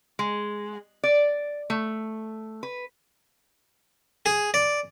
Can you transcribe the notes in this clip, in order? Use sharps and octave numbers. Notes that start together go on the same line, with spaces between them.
G#3
D5
A3
B4
G#4
D5